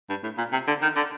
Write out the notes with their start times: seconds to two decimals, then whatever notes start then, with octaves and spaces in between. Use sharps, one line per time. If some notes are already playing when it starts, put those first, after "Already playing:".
0.09 G2
0.23 A2
0.38 A#2
0.52 C3
0.67 D3
0.82 D#3
0.96 D3